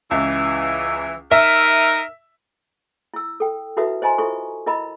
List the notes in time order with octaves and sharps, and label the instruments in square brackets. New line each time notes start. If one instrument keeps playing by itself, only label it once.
[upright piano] C#2 [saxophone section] E3
[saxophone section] D#4 A#4 [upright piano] E5
[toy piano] E4 E6
A4 G5
D#4 E4 F#4 A4 B4 E5
C5 D#5 G#5 A#5 C6
E4 F4 A4 C5 C#6
E4 A#4 D#5 A#5 B5